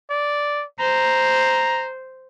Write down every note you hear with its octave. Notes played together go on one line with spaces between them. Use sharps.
D5
C5 A#5